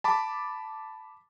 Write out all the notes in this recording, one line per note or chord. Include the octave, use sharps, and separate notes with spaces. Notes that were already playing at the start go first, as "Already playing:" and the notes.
A5 B5 D6